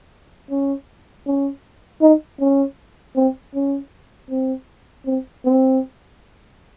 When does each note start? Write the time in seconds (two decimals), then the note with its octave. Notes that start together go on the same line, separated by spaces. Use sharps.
0.50 C#4
1.26 C#4
2.02 D#4
2.41 C#4
3.16 C4
3.55 C#4
4.31 C4
5.06 C4
5.45 C4